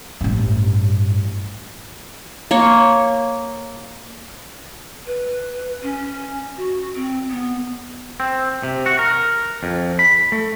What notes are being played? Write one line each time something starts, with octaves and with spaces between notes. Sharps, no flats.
A1 G2
A#3 C#5
B4
C#4
F#4
C4
B3
C4
C3
F#4
A#4
F2
B5
A3